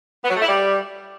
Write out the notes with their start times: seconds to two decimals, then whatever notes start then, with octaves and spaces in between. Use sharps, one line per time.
0.24 B3
0.30 F#3
0.36 A3
0.42 E4
0.48 G3